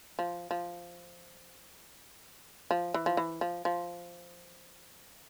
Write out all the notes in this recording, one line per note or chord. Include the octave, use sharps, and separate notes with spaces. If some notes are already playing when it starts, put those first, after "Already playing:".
F3
F3
F3
E3
F3
E3
F3
F3